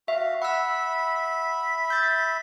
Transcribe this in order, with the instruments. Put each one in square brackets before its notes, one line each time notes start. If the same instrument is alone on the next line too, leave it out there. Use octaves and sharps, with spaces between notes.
[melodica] F#4 F5 [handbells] E5
[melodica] E5 B5 [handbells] F#5 E6
[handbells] G6 A6